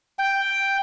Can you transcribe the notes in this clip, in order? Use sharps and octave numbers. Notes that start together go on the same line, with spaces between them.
G5